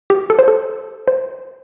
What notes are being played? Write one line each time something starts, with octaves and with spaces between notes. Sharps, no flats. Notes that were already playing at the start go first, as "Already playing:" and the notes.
G4
A4
C5
A4
C5